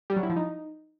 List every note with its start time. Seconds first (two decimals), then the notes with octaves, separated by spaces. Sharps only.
0.10 G3
0.16 F#3
0.23 E4
0.30 F3
0.36 D#4